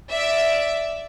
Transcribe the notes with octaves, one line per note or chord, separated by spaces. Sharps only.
D5 E5